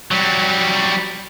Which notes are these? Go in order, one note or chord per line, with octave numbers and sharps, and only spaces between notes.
F#3 G3